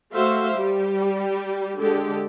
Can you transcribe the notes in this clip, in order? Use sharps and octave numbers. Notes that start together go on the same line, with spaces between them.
A3 F#4 C5 E5 F5
G3 G4
D3 G#3 G4 A4